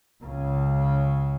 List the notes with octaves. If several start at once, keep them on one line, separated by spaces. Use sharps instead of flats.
C#2 C#3